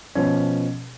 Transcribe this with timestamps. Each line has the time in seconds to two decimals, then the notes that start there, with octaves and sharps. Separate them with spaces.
0.15 B2 F3 C#4